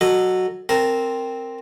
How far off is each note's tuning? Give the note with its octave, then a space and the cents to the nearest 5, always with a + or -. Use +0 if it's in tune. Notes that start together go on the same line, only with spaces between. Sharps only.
F#3 +0 A4 +0 D#5 -20
C4 +0 A#4 -10 A5 -25